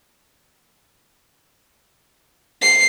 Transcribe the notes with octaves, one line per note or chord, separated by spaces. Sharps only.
C7